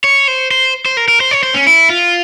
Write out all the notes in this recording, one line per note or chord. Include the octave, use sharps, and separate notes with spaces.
C#5
C5
C5
C5
A#4
A#4
C5
C#5
C5
C#4
E4
F4